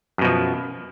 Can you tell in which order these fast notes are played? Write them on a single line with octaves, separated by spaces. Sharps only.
F#2 B2 F3